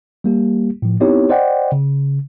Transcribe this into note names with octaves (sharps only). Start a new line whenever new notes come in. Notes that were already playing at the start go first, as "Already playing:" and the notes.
G3 A#3 G4
A2 F3
B3 C4 D#4 E4 G4 C#5
C5 D5 D#5 F#5 G5
C#3